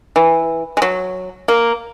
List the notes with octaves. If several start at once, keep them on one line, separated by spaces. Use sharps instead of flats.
E3
G#3
F#3
A#3